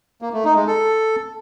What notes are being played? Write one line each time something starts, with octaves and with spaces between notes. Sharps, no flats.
A#3
A3
D#4
G#3
A4